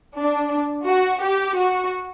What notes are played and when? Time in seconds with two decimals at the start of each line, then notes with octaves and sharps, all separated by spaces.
0.18 D4
0.87 F#4
1.23 G4
1.57 F#4